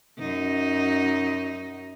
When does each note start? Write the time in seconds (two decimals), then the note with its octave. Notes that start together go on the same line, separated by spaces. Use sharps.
0.19 F#2 D#4